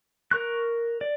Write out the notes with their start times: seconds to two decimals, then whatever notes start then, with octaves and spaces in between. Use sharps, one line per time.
0.31 A#4 C#6 F#6
1.01 D5